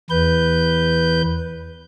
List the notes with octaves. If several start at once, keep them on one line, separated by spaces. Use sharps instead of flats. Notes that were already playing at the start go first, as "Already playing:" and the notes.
E2 B4 G6